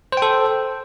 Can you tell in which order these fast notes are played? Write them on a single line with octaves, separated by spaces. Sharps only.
C5 G5 A4